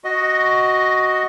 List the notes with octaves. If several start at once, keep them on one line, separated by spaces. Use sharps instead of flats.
F#4 D#5